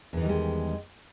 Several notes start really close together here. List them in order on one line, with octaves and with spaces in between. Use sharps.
E2 E3 D#3 G3 G#3